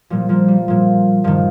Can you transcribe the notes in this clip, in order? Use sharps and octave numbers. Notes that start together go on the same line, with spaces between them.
A#2 F3 G3
F3 A#3
G3
A#2 F3
G2 D#3 F3